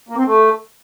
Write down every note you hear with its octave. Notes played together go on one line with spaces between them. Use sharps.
A#3
C4
A3